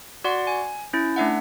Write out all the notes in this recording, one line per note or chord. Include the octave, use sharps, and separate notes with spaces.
F#4 D5 F#5 C6
G#5
C#4 E4
A3 D4 E5 F#5